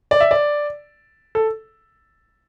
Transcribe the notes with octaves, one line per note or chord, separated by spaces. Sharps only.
D5
E5
D5
A4